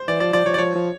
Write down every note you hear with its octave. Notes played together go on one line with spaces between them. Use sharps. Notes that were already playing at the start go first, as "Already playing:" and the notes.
Already playing: C5
E3 D5
F3 D5
F3 D5
F3 C#5
D5
F3 C#5
F3